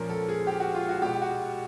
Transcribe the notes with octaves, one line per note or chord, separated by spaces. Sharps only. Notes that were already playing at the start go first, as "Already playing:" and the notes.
Already playing: A#2 F3 A#3 C#4 A#4
A4
G#4
G4
F#4
F4
F#4
B2 G#3 B3 G4
F#4